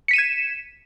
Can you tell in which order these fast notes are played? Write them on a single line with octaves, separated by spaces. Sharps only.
C#7 B6 D#7 E7 G#6